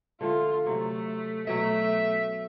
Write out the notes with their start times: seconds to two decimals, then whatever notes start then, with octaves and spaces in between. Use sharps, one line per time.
0.21 D3 F3 A3 F4
0.66 C3 F#3 A3
1.47 B2 F#3 A3 E5